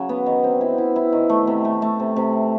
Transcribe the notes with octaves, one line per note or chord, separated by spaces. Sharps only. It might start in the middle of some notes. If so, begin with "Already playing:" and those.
Already playing: C#3 F#3
B3
D#3
C4
E4
E4
E4
D#3
A3
C3
A3
A3
C3
C3